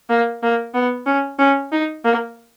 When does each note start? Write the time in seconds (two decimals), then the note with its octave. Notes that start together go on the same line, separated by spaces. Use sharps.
0.09 A#3
0.43 A#3
0.74 B3
1.06 C#4
1.39 C#4
1.72 D#4
2.04 A#3